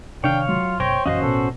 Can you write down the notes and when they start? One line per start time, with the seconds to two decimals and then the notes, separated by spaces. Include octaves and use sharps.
0.24 C3 D#3 D4 C#5 F5 G5
0.49 F#3 F4
0.80 F#1 B2 C5 C#5 G5 A#6
1.06 A#1 F#2 E3 C#4 F#4 C5 D#5 F5
1.22 A1 B2 A4